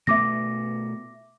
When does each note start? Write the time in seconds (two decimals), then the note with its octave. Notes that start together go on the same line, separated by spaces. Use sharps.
0.07 B2 A3 B3 E5 D6 A#6